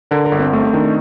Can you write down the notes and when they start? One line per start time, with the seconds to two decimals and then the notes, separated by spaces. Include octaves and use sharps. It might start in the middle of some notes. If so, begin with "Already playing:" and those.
0.11 D3 A#4
0.25 A#4
0.32 G1
0.39 C4
0.53 A3 C4
0.63 C4
0.73 D#3 D4
0.85 D#4